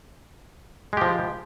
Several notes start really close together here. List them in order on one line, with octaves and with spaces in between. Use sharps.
G#3 G4 F3